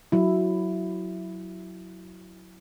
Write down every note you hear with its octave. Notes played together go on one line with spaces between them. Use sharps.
F#3 E4